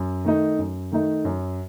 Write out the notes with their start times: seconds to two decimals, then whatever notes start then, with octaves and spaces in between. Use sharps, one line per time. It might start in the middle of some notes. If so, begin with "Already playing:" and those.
Already playing: F#2
0.25 D#3 A3 D#4
0.59 F#2
0.92 D#3 A3 D#4
1.25 F#2